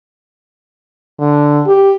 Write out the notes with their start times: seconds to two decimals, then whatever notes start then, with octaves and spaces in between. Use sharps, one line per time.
1.20 D3
1.66 G4